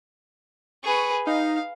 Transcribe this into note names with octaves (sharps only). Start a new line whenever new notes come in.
G#4 B4 C#6
D#4 F5